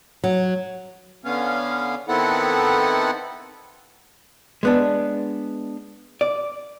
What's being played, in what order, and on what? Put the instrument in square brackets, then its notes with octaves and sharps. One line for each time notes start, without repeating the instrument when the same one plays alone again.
[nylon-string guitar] F#3
[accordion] D3 B3 C#4 F5
D#3 B3 C4 E4 A4 F#5
[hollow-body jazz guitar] G#3 B3 D4
D5